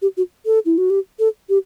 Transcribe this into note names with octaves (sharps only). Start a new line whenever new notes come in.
G4
F#4
A4
E4
F#4
G4
A4
G4